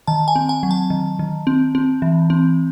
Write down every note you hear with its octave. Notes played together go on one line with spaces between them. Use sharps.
D#3 A5
G#5
C4
G#5
F#3
A5
D#3
D#3
C4
C4
E3
C4